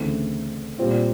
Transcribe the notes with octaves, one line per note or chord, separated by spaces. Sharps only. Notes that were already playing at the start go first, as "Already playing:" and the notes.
Already playing: D2 C#3 E3 A3 C4
A#2 G3 C4 F4